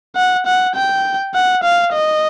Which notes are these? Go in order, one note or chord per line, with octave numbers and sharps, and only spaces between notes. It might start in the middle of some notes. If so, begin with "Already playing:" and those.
F#5
F#5
G5
F#5
F5
D#5